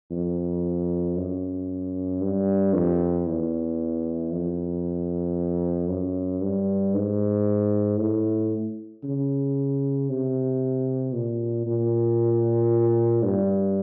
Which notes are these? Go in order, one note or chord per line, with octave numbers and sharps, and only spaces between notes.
F2
F#2
G2
F2
E2
F2
F#2
G2
G#2
A2
C#3
C3
A#2
A#2
G2